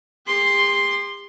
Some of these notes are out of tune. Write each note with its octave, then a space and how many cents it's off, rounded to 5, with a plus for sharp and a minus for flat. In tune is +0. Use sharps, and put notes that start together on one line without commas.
G4 +45 C6 +0